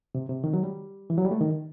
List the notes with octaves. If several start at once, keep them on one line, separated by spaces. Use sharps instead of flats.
C3
C3
D#3
F#3
G3
E3
F#3
G3
A3
D#3